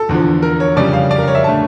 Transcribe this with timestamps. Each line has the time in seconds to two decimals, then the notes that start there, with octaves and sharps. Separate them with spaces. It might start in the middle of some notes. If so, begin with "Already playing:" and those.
Already playing: A4
0.09 E2 D3 F3
0.42 A#4
0.60 C#5
0.76 F2 C#3 G3 D5
0.93 F5
1.11 D5
1.19 A#4
1.28 C#5
1.35 E5
1.44 D3 A3 A5